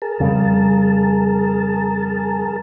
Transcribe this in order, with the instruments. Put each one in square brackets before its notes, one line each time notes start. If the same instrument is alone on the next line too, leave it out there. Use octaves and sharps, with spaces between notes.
[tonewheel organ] G#4 A#4 A5
[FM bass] F2 [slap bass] C#3 G3